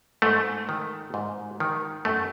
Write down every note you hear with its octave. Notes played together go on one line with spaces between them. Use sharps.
G#2 A3
D#3
G#2
D#3
F#2 A3